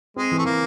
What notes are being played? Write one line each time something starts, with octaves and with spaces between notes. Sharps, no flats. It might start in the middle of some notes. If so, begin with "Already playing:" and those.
G#3 C4
E3
A3
E3 A#3